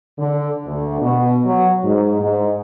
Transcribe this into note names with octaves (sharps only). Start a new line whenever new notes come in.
D3
D2
B2
F#3
G#2
G#2